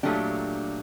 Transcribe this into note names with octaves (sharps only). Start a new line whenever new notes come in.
A#2 F#3 A3 D4 G4